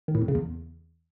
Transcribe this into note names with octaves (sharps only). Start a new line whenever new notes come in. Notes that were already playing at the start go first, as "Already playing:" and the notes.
D#3
A2
F2
C#3
E2